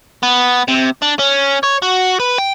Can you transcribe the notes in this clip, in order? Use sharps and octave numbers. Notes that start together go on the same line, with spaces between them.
B3
C3
D4
C#4
C#5
F#4
B4
G5